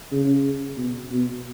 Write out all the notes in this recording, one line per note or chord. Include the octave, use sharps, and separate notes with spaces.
C#3
B2
B2